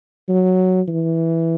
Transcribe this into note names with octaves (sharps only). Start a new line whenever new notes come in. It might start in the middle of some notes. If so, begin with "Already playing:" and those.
F#3
E3